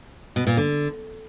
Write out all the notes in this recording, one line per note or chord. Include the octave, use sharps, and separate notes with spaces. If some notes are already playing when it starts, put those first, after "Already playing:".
B2
A#2
D3